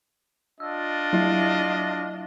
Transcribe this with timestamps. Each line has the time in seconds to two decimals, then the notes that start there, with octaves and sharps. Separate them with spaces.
0.60 D4 F4 D#5 E6
1.13 F#3 E4 E5